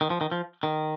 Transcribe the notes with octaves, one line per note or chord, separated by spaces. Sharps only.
D#3
F3
D#3
F3
D#3